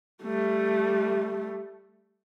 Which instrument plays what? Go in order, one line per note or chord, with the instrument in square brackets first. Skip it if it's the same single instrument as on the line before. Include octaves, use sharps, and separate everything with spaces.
[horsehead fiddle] G3 A3